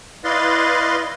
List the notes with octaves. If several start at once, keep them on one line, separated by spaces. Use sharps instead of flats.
E4 B4 D5 D#5 F5 C6